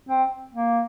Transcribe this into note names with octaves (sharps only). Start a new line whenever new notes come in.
C4
A#3